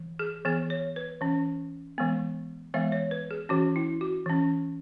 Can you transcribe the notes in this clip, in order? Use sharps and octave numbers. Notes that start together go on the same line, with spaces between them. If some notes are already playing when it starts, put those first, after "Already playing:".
Already playing: E3
G#4
E3 B3 G#4
C#5
B4
E3 C#4
E3 G#3 B3
E3 G#3 B3 E5
C#5
B4
G#4
E3 C#4 F#4
E4
F#4
E3 C#4